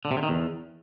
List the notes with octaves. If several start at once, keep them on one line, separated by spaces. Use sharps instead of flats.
D3
C3
D3
D#3
E2